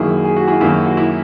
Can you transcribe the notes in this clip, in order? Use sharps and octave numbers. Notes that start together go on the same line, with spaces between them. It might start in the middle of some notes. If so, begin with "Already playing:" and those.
Already playing: F#2 D#3 F#3 A#3 E4 G#4
G#4
F#4
E4 G#4
F#2 D#3 F#3 A#3 E4
F#4
E4